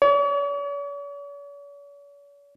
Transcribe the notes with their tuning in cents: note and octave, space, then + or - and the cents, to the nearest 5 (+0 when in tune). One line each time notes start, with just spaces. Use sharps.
C#5 +45